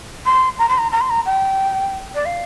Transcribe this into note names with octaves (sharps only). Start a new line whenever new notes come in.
C6
A#5
C6
A#5
A#5
C6
A#5
G5
D5
F5